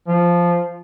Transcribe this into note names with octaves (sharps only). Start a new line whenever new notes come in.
F3